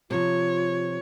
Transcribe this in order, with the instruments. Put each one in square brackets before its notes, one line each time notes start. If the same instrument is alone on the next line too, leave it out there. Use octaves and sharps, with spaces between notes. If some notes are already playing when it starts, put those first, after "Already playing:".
[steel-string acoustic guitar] C3 F3 [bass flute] F4 [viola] C#5